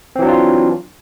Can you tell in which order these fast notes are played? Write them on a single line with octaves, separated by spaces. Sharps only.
C4 E3 F#3 D4 F4